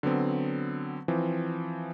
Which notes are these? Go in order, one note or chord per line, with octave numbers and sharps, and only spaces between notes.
D3 F#3 B3 C4
E3 F3 C4